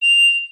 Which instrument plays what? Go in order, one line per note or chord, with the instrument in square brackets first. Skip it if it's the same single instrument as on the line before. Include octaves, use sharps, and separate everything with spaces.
[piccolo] F7